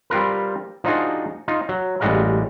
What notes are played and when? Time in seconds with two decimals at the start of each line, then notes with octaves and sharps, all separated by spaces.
0.10 G3 C4 F4 A#4 B4
0.84 F3 D4 D#4 F4 F#4 G#4
1.48 D#4 F4
1.69 F#3
2.00 A1 G3 G#3 F#4 F5 A#5